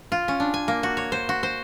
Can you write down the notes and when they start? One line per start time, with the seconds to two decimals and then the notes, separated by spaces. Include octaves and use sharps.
0.12 F4
0.28 C#4
0.40 D4
0.54 G#5
0.68 A#3
0.83 F#4
0.97 C#5
1.12 C5
1.29 F#4
1.43 C5